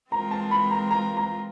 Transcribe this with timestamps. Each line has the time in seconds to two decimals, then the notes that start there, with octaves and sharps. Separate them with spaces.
0.12 E3 G#3 C4 F4 A#4 A#5
0.31 A5
0.51 B5
0.71 A#5
0.91 A#5
1.17 A#5